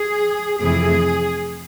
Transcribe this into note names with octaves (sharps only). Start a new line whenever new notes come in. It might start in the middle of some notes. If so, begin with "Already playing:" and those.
Already playing: G#4
F2 C3 E3 A3 G#4